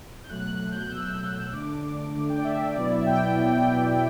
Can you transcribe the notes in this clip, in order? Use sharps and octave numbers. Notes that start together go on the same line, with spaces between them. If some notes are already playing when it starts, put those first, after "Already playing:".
G6
B2 F#3 A3 F#6
B2 F#3 A3
G6
F#6
B2 F#3 A3 E6
B2 F#3 A3
D3 A3 D4 D6
D3 A3 D4
D3 A3 D4
G5
D5
D3 A3 D4 E5
B2 F#3 B3 E4 D5
E5
B2 F#3 B3 E4 G5
B2 F#3 B3 E4
B2 F#3 B3 E4